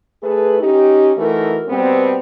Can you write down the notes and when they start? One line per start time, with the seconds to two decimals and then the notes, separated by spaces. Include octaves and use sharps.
0.23 A3 G#4 A4 B4
0.60 C#4 D#4 G4
1.16 E3 A3 D#4 F#4 A#4
1.68 B2 G3 B3 C4